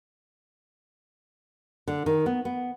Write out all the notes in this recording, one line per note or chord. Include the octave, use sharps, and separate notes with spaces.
D3
D#3
B3
B3